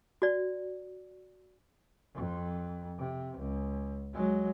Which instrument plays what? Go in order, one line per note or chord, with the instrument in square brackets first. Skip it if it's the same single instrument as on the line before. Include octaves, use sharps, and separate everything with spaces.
[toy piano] F#4 D5
[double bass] F2
C3
C#2
F#3 G#3